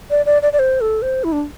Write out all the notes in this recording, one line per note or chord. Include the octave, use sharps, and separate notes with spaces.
D5
D5
D5
D5
C5
A4
C5
E4
D4